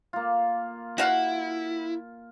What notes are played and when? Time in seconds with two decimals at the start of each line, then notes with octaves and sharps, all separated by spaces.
0.13 A#3 F4
0.98 E4 F#4 F5 F#5